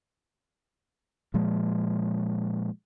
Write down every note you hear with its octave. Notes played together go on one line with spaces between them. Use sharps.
A#2 F3 G#3